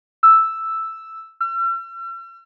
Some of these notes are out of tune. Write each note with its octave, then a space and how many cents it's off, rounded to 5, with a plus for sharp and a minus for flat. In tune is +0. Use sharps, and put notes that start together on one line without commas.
E6 +0
E6 +45